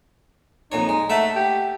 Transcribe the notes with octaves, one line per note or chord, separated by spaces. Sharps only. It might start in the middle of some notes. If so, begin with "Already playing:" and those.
F2 A#2 D#4 C#5
G#3
A3 E5 F#5 A5
G4